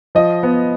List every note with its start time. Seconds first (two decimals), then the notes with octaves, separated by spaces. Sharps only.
0.15 F3 D#5
0.43 B3